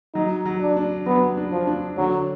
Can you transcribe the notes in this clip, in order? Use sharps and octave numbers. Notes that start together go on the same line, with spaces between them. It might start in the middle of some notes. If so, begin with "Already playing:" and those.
F#3 D#4
F#3
D4
D4
F#3 B3
D4
F3
D4
D3 F#3